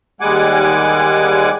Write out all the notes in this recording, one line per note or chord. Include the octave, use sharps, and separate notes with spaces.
D#2 G3 G#3 F#5 G#5 D6